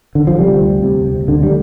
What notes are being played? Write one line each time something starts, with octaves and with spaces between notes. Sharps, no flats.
D3
F3
C3 G3
D2
C3
C3
D2 D3
G3